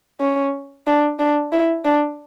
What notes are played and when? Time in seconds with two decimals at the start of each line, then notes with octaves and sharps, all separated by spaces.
0.20 C#4
0.87 D4
1.19 D4
1.52 E4
1.85 D4